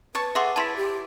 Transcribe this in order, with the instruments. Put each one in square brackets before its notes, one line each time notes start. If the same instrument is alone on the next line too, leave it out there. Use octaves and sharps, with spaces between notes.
[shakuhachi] B4 [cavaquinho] C#5 A5 C#6
[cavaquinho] G#4 A4 F#5 [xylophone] E5 C6 D6
[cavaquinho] E4 C#5 D5 [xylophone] A5 C6 B6
[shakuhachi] G4